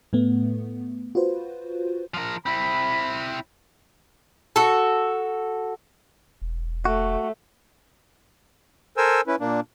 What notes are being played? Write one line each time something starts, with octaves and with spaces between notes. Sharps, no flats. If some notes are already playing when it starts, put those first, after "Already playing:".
A2 A3 B3
F4 F#4 B4 C5
F3 A#4
C4 E4 B5
F#4 A4
E1
A3 F#4
A4 A#4 C5 G#5 E6
C#4 E4 B4
A#2 A#3 D4